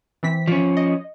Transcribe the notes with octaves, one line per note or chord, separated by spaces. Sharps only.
E3 C4 B6
F3 C#4
D#5